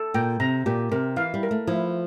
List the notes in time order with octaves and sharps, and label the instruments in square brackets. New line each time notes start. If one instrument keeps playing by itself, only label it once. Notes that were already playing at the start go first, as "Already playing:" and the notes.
Already playing: [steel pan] A4
[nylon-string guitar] A#2 [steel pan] G5
[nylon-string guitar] C3 [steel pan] A#5
[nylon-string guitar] A#2 [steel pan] G4
[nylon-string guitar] C3 [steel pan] A#4
[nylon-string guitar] E3 [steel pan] F5
[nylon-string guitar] G3
[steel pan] A#4
[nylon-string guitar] A3
[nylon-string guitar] F3 [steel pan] E4